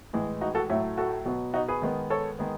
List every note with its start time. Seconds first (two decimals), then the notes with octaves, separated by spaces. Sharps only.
0.13 A2 E3 G#3
0.41 D#4 F#4
0.55 F#4 A4
0.69 A2 F#3 A3 C#5 E5
0.98 F#4 A4
1.25 B2 F#3 B3
1.54 D#4 F#4
1.68 G#4 B4
1.82 D#3 G#3 B3
2.10 A4 C#5
2.39 D#3 G#3 B3